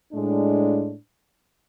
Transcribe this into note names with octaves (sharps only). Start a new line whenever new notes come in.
A2 G#3 D4